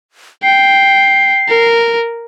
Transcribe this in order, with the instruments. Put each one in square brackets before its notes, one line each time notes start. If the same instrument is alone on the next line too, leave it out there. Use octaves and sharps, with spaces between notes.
[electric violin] G5 [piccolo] C7
[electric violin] A#4